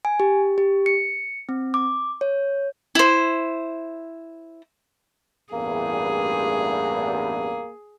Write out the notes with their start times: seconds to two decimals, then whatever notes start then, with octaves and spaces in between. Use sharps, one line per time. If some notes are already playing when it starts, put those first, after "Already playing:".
0.05 G#5
0.20 G4
0.58 G4
0.86 C#7
1.49 C4
1.74 D6
2.21 C#5
2.95 E4 C5
5.53 A1 E2 G2 A#3 G#4